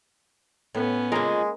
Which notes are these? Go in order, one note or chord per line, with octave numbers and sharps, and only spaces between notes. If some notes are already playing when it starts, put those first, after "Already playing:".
A2 B3 C#4
G#3 A#3 F4 A#4 D#5 G#5